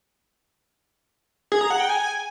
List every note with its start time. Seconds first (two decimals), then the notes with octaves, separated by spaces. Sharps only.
1.52 G#4
1.61 A#5
1.70 F#5
1.80 G5
1.89 G#5